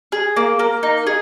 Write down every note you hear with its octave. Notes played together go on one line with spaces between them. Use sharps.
G#4
A#3
A#3
D#4
G#4